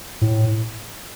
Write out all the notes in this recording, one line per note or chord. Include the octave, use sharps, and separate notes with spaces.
A2